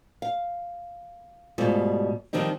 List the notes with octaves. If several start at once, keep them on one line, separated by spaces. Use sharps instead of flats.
F5
G#2 B2 G3 A3 F4
D#3 F3 G3 C4 D#4